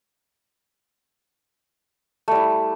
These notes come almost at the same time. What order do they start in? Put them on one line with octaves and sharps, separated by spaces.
A3 G3 E4